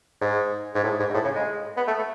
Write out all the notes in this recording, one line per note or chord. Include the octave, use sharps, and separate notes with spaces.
G#2
G#2
A2
G#2
G#2
A2
C#3
G#3
B3
A3
A3